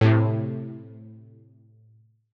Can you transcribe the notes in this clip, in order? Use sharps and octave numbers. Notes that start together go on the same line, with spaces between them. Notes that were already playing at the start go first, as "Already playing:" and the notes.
A2 C3